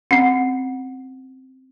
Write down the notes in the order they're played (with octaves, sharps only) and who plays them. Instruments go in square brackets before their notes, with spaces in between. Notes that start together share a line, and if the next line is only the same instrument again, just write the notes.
[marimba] C4 C#4 [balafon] F#5